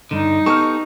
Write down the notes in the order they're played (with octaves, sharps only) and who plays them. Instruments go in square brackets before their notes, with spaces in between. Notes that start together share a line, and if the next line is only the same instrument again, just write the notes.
[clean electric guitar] G2 D3 [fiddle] D#4
[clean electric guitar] B3 G4 A4 [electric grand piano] C#6 F6